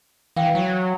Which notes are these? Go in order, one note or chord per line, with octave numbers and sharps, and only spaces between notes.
E3 F5 G5
F#3